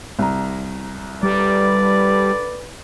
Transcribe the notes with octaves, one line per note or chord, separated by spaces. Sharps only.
C2 A#5
D3 G3 A4 B4 D5